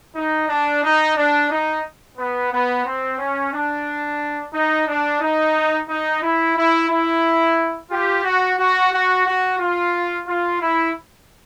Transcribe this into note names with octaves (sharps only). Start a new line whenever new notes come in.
D#4
D4
D#4
D4
D#4
B3
B3
C4
C#4
D4
D#4
D4
D#4
D#4
E4
E4
E4
F4 G4
F#4
F#4
F#4
F#4
F4
F4
E4